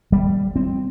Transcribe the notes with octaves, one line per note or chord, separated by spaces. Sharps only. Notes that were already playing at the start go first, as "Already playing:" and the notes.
G3
C4